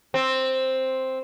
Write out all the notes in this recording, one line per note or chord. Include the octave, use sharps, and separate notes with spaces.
C4